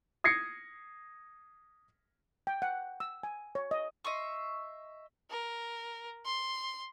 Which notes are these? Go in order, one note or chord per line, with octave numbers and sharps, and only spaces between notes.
D#6 G#6 A#6 C7 C#7
G5
F#5
E6
G#5
C#5
D#5
D#5 E5 C6 C#6
A#4
C6